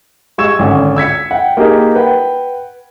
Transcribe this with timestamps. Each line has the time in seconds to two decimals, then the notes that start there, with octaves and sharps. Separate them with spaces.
0.38 G#3 G4 C#6 E6 G#6 E7
0.59 G#1 D3 C#4 F#5
0.96 E6 G#6 B6 C#7
1.31 F#5 G5
1.57 A#3 D#4 G4 G#4 A#4
1.95 B4 F#5 G5